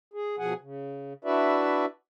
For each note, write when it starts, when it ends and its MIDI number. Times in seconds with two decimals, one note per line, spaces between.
0.14 0.36 68
0.39 0.54 47
0.39 0.54 53
0.39 0.54 68
0.39 0.54 78
0.39 0.54 80
0.61 1.13 49
1.24 1.86 62
1.24 1.86 64
1.24 1.86 66
1.24 1.86 71
1.24 1.86 74
1.24 1.86 76